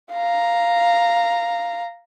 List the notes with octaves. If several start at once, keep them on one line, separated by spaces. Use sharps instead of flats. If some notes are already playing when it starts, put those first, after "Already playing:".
F5 A#5